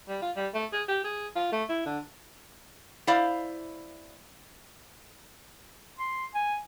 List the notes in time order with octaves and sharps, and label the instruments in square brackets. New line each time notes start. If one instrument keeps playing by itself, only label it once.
[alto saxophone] G3
F4
G3
A3
G#4
G4
G#4
F4
A3
E4
D3
[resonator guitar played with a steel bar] E4 C5 D5 F5
[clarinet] C6
G#5